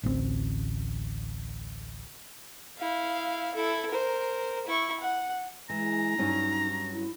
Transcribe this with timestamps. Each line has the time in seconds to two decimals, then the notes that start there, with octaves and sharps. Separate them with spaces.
0.03 A1 D2 A3 C4
2.78 E4 F5
3.55 E4 A4
3.91 A#4 C5
4.67 E4 C#6
5.00 F#5
5.70 E3 G#3 A#5
6.19 G2 F#3 C#4 D#4
6.93 E4